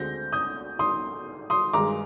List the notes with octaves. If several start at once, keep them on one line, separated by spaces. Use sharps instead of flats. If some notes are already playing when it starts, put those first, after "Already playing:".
Already playing: D2 D3 G#3 C4 G6 A#6
D#6 G6
C6 D#6
C6 D#6
G2 D#3 G#3 A#5 D6